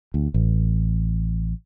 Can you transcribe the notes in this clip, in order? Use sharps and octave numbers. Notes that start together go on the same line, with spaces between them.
D2
A1